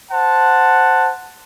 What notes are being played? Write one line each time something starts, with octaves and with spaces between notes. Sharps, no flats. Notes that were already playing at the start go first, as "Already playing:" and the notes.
C5 F#5 A5